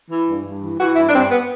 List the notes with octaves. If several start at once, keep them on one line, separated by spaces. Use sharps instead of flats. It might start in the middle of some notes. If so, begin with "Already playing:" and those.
E3
G2
G2
E3
E3 F#4
G2 E4
D4
G2 C4
B3